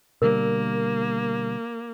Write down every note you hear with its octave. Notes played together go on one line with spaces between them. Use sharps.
B2 D3 G3 A#3 A#4